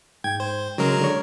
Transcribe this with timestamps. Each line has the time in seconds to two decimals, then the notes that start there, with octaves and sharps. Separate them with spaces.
0.24 G#2 G5 G#6
0.40 C5
0.78 C#3 F#3 G#3 A#4
1.01 D3 C#5